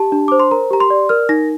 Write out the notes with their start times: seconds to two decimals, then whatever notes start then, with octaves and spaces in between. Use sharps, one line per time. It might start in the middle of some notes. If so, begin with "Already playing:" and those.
Already playing: G4 A5
0.12 D4
0.28 C5 D6
0.40 C6
0.51 A#4 A#5
0.71 G4 A#5
0.80 C6
0.90 D5
1.09 A#4 F6
1.29 D#4 A#6